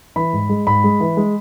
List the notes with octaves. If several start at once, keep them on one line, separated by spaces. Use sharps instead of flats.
E3 B5
G#2
G#3
G#2 B5
G#3
E3
G#3